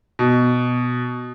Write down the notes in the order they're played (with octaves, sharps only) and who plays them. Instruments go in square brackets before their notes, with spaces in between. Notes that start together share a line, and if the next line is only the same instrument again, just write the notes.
[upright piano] B2